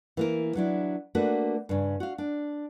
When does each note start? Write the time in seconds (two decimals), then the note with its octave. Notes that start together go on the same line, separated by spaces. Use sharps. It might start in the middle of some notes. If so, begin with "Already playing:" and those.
0.17 E3 A#3 A#4
0.55 F#3 D4 E4
1.15 A3 A#3 D4 F#4 B4
1.69 G2 C#3
2.00 F#4 F5
2.18 D4